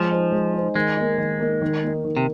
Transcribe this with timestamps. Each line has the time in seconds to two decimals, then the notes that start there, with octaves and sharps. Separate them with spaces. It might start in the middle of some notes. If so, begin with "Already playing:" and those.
Already playing: F3 G#3
0.11 D#4 C5
0.32 G#3
0.54 D#4 C5
0.75 D#3 G#3
0.97 A#3 D#4
1.18 D#3
1.40 A#3 D#4
1.62 D#3
1.83 A#3 D#4
2.05 D#3
2.17 C3